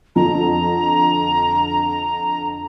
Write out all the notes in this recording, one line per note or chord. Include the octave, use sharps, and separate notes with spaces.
F2 D3 A#5